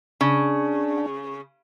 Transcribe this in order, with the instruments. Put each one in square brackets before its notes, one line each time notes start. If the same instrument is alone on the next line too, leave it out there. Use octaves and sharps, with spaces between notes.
[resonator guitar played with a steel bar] C#3 [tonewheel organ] D4